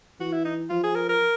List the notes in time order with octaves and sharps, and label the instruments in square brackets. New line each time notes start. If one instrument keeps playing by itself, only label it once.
[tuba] E3 [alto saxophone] F#4
[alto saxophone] E4
D#4
[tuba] F3 [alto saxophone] F4
[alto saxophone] G#4
A#4
A#4